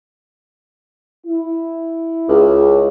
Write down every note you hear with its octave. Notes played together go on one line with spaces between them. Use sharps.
E4
C#2